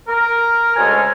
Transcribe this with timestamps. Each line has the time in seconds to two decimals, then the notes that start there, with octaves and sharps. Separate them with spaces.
0.08 A#4
0.77 D2 C#3 G#3 C#4 A4 G#5